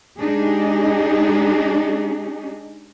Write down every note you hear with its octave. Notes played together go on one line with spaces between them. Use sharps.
G#3 D4 D#4 G4 G#4